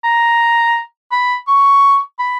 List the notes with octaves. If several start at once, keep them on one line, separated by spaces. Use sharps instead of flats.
A#5
B5
C#6
B5